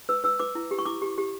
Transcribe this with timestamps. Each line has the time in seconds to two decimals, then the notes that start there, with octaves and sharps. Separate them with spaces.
0.09 B4 E6
0.24 B4 E6
0.39 B4 D6
0.55 E4
0.71 G4
0.79 C#6
0.86 E4 D6
1.02 G4
1.18 G4